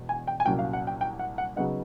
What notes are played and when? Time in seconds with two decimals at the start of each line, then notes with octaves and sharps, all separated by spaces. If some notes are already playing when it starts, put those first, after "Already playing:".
Already playing: E1 E2 B2
0.09 G#5
0.27 G5
0.40 G#5
0.46 C2 A#2 F#3 A#3 C#4 G5
0.59 F5
0.73 F#5
0.87 G5
1.01 G5
1.19 F#5
1.38 F#5
1.56 C#3 F#3 B3 D#4 F#5